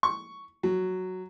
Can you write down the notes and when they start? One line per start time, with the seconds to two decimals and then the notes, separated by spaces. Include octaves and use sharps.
0.03 C#6
0.63 F#3